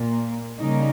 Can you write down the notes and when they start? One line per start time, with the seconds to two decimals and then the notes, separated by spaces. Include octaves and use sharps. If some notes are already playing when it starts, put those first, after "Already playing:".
Already playing: A#2 A#3
0.59 C#3 G3 A#3 D#4